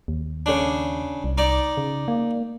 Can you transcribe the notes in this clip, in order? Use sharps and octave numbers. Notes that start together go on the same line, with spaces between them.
D#2
C#3 D4
C2
D#4 D5
C#3
A#3